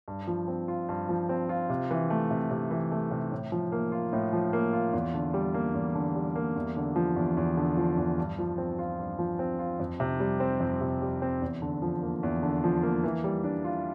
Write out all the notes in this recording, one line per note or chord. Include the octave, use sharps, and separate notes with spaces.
G2
F3
C4
F4
G2
F3
C4
F4
C3
E3
A3
C3
C3
E3
A3
C3
A2
F3
A#3
F4
A2
F3
A#3
F4
E2
D3
G3
A#3
E2
D3
G3
A#3
E2
D3
F3
E2
E2
D3
F3
E2
G2
F3
C4
F4
G2
F3
C4
F4
F2
C3
G3
C4
F2
C3
G3
C4
E2
D3
F3
A#3
E2
D3
F3
A#3
E3
G3
D4
F4